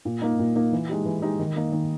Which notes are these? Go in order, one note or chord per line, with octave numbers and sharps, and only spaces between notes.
A#2
A#3 D#4
A#2
A#3 D#4
E3
G#3 D#4 G4
E3
G#3 D#4 G4
D#3
A#3 D#4
D#3